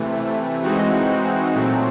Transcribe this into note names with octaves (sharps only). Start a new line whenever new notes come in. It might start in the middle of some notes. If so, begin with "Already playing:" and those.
Already playing: C3 E3 A3
E3 G#3 C4 D#4 F#4
A#2 F#3 A3 C4